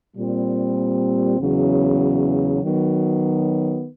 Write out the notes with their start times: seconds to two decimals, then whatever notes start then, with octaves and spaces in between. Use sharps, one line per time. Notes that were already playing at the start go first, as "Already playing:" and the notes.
0.15 A#2 G3 C4
1.39 E2 C#3 F#3
2.63 D#3 F#3 B3